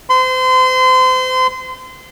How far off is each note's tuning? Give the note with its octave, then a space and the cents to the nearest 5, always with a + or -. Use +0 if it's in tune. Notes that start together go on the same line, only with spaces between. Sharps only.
C5 -35 C6 -30